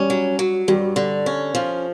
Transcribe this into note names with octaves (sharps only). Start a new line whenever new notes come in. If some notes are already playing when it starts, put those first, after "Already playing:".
Already playing: G3 C#4
F#3
F#3
G2 G3
D3
C#4
F3